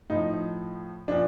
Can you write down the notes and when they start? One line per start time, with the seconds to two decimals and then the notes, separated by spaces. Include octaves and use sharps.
0.10 A2 F3 D#4
1.08 A#2 F3 D4